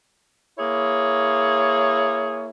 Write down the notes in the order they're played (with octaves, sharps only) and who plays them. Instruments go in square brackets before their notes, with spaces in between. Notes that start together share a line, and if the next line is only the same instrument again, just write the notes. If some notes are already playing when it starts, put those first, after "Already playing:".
[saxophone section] A#3 E4 G#4 C#5